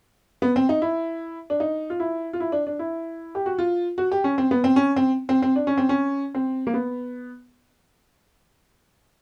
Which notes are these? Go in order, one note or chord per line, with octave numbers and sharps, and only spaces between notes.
B3
C4
D#4
E4
D4
D#4
F4
E4
F4
E4
D4
D4
E4
G4
F#4
F4
F#4
G4
C#4
C4
B3
C4
C#4
C4
C4
C4
D4
C#4
C4
C#4
C4
A#3
B3